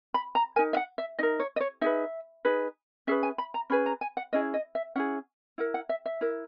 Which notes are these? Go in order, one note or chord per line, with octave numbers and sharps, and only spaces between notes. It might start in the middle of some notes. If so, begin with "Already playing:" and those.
B5
A#5
D#4 A#4 G#5
E5
F#5
E5
D#4 A#4 D#5
C#5
D#5
C#5
D#4 G#4 B4 E5
D#4 G#4 B4
C#4 G#4 B4 E5
G#5
B5
A#5
C#4 G#4 B4 B5
A#5
G#5
F#5
C#4 E4 G#4 D#5
D#5
E5
C#4 E4 G#4 F#5
E4 A#4 F#5
F#5
E5
E5
E4 A#4